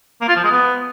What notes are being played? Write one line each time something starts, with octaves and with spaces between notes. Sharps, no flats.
A#3
F4
F3
G#3
B3